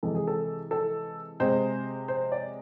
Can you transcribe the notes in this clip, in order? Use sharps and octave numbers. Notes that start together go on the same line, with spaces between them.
C3 E3 G#3 A4
G#4
A4
A4
C3 G#3 C5
C5
D5